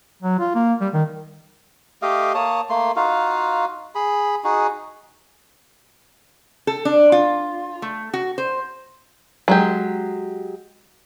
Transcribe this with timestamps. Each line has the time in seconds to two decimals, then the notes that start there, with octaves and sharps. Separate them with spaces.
0.22 F#3
0.39 F4
0.55 A#3
0.81 G3
0.94 D#3
2.02 A3 G4 D#5 F5
2.34 A#3 C#5 A5 D#6
2.70 A3 A#3 C6
2.96 D#4 F4 F#4 F5
3.95 G#4 B5
4.44 D#4 F#4 G#4
6.67 A4
6.85 D4
7.12 F4
7.82 A3
8.14 F#4
8.38 C5
9.48 F#3 G#3 G4